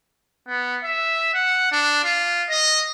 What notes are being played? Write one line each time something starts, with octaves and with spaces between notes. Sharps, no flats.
B3
E5
F#5
D4
F4
D#5